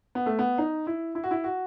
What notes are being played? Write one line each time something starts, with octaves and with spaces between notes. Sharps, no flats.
B3
A3
B3
D#4
E4
E4
F#4
E4
F#4